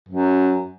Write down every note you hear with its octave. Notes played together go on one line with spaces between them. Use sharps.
F#2